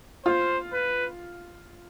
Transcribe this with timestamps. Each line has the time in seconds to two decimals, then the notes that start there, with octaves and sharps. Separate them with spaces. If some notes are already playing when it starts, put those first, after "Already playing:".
0.25 F4 C5
0.72 B4